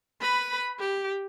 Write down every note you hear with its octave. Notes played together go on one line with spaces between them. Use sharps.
B4 B5
G4